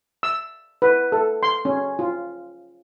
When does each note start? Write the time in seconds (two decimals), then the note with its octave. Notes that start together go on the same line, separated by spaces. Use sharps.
0.23 E6
0.82 B4
1.12 A4
1.43 C6
1.65 C#4
1.99 F4